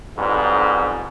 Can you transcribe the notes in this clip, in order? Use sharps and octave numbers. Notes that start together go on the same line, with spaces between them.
B1 F2 G#2 G3 G#3 B3